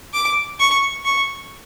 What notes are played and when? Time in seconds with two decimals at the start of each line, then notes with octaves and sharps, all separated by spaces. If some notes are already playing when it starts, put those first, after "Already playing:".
0.13 D6
0.59 C#6
1.05 C#6